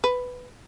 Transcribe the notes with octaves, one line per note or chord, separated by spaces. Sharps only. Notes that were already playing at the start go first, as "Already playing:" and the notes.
B4